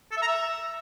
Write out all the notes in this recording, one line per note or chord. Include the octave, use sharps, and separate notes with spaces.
A4
E5
A#5
E5